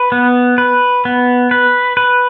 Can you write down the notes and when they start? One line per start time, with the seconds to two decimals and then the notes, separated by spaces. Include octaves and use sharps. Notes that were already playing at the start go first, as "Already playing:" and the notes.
Already playing: B4
0.12 B3
0.58 B4
1.05 B3
1.51 B4
1.97 B4